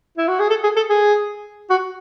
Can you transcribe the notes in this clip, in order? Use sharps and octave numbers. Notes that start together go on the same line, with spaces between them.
E4
F#4
G#4
A4
G#4
A4
G#4
F#4